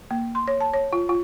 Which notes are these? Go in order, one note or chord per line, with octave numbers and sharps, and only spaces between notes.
A#3
C6
C#5
A5
C#5
F4
F4